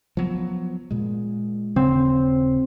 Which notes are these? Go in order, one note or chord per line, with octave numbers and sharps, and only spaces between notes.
F3 F#3 B3
A#2 G#3
D#1 C#3 C4